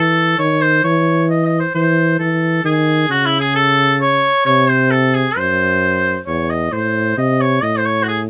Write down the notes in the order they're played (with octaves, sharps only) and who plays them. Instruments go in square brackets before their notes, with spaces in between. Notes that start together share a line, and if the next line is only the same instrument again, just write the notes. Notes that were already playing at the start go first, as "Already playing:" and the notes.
Already playing: [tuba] E3 [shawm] A4
[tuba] D#3 [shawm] C#5
[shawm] C5
[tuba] E3 [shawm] C#5
[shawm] D#5
D#5
C5
[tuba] E3 [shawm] C5
[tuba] E3 [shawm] A4
[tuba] D#3 [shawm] G#4
[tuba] C#3 [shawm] F#4
[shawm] E4
G#4
A4
C#5
[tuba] C3 [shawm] C#5
[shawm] C5
A4
G#4
[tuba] F#2 [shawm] C5
[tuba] E2 [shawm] C#5
[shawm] D#5
[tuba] A2 [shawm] C5
[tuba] C3 [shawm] D#5
[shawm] C#5
[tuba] A2 [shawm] D#5
[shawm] C5
C#5
F#4
G#4